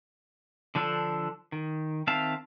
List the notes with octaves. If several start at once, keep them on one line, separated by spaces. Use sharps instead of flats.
D3 F3 D4 A4
D#3
D#3 C4 E5 F5 A5